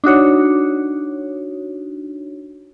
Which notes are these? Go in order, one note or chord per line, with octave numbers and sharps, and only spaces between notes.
D4 D#4 F#4 C#5